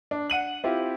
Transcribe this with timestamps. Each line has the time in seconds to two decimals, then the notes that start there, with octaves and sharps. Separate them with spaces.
0.11 D4
0.30 F#5 D#7 F#7
0.64 C4 E4 F4 G4